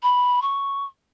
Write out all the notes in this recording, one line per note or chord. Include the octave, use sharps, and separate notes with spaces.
B5
C#6